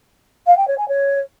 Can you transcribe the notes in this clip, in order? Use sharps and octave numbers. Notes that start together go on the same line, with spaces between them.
F5
G5
C#5
G#5
C#5